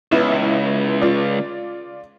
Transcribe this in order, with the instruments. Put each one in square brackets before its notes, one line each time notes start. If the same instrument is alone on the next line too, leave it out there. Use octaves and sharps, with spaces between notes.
[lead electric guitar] C#2 [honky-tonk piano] B3 E4
[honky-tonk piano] F4 D5